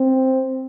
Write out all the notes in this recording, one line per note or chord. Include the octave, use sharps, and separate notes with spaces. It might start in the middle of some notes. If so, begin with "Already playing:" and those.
Already playing: C4